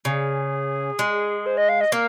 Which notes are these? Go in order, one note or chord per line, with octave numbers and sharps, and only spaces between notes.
C#3 G#4
G#3
C5
D#5
F5
D#5
A#3 A#4